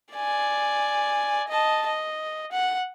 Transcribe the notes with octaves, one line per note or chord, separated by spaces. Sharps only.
D5 G#5
D#5 A5
D#5
F#5